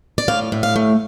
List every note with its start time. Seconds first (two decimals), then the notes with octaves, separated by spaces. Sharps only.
0.18 D5
0.28 A2 F5
0.52 A2
0.63 F5
0.76 A3